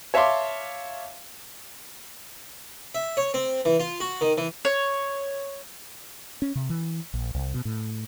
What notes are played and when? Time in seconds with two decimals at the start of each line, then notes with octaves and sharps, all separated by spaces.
0.14 C#5 E5 F5 A5 C6 D6
2.95 E5
3.17 C#5
3.34 C4
3.65 E3
3.80 F4
4.00 F#4
4.21 D#3
4.38 E3
4.65 C#5
6.42 C#4
6.55 C3
6.69 E3
7.14 A#1
7.35 C2
7.54 B2
7.65 A2